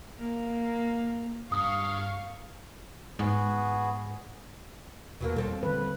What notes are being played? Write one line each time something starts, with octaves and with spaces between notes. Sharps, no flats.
A#3
G2 F5 C#6 D#6
G#2 B3 F#4 G#4
E1 B2 F#3 A#3
D#2 G3 C4 A4
D3 D#3 G3 B4